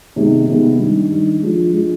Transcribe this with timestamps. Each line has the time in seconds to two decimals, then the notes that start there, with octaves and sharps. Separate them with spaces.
0.16 C3 D#3 G#3 B3
0.47 C3 D#3 G#3 B3
0.79 D#3 G3 D4
1.10 D#3 G3 D4
1.42 F3 G#3 D4
1.73 F3 G#3 D4